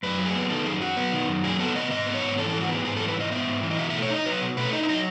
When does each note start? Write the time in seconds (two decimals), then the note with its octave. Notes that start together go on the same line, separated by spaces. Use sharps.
0.03 F#2 B4
0.18 F#3
0.26 G#4
0.35 B3
0.50 D#3 A4
0.65 F#2 G#4
0.81 F#3 F#4
0.97 B3
1.12 D#3
1.28 F#2
1.44 F#3 G#4
1.59 B3 A4
1.75 D#3 D#5
1.91 G#2 D#5
2.06 B3
2.14 C#5
2.23 G#2
2.38 E3 A4
2.49 G#2 A4
2.61 F#4
2.69 B3 G#4
2.85 G#2 G#4
2.96 E3 A4
3.08 B4
3.16 G#2 D#5
3.32 B3 E5
3.47 G#2
3.63 E3
3.71 D#5
3.79 B2 E5
3.90 A3 E5
4.03 C#5
4.10 D#4 D#5
4.26 F#3 B4
4.41 B2
4.57 A3 B4
4.73 D#4 D#5
4.83 E5
4.89 F#3 D#5